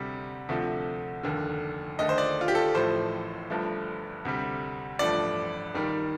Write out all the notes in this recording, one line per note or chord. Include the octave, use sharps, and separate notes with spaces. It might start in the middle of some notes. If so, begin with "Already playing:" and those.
Already playing: D2 C3 G3
D2 C3 F3 A3
F1 D#2 D3
D#2 D3 A3 D#5
C5
D5
F4
G4
A4
A1 A2 F3 A3 C5
G1 G2 F3 A3
D2 C3 G3
A1 G2 F3 A3 D5
D#2 D#3 G3